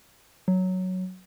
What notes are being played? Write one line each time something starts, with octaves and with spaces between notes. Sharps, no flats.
F#3